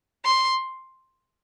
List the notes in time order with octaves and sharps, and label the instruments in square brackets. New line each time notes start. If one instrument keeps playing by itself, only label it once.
[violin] C6